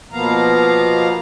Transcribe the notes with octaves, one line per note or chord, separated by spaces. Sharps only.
B2 F3 A#3 B3 F5 A#5